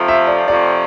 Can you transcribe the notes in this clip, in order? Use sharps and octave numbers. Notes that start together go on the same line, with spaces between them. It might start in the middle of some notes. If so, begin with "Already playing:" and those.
Already playing: F2 C3 F3 A3
E5
D5
F2 C3 F3 A3 D5